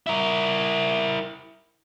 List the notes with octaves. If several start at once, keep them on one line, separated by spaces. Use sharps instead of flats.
E4 A#4